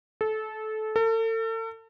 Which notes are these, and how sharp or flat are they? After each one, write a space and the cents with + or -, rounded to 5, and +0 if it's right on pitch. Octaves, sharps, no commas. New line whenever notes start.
A4 -20
A4 +40